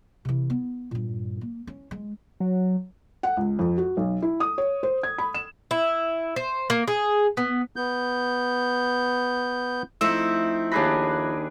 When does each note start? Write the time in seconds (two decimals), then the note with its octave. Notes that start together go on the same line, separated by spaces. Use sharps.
0.25 C3 E3
0.50 B3
0.91 G2 A#2
1.41 A#3
1.67 C#4
1.91 G#3
2.40 F#3
3.23 F#5
3.37 C#2
3.59 F2
3.78 F#4
3.97 B1
4.22 E4
4.40 D#6
4.58 C#5
4.83 C5
5.03 G#6
5.18 B5
5.34 E7
5.71 E4
6.36 C5
6.70 A#3
6.88 G#4
7.37 B3
7.76 B3 G6
10.01 F3 A3 C4 D#4 E4 E6 E7
10.72 D#2 D4 G#4 B4 B5 A#6